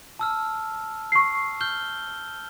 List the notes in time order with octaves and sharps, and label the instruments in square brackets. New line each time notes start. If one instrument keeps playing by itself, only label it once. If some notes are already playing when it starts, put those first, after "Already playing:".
[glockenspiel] A5 E6 F6
[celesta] C#6 C7
[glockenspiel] F6 G6 G7